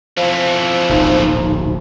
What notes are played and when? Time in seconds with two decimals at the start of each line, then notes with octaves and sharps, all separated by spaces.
0.17 F2 E3 F3
0.89 D1 A#1 B2 D#4